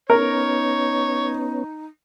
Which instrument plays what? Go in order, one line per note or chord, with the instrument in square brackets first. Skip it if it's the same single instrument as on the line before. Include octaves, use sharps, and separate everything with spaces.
[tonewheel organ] B3 C#4 [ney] D#4 [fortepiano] A#4 [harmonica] C#5